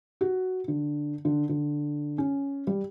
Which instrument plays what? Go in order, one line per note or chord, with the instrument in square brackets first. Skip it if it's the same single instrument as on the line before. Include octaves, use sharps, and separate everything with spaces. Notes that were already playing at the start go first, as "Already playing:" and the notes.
[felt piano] F#4
D3
D3
D3
C#4
G3